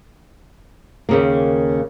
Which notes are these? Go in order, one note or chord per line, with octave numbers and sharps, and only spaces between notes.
D#2 C#3 A#3